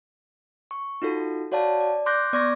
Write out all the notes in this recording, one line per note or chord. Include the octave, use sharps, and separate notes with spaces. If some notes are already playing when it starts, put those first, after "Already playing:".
C#6
D#4 F4 F#4 A4
F#4 C#5 D5 F5 A5
D5
C6 D6 F#6 G6 A#6
B3 D5 C#6 D6 G#6 A#6